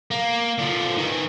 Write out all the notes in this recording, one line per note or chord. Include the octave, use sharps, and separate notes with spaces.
A#3
D3 F3
D#3 E3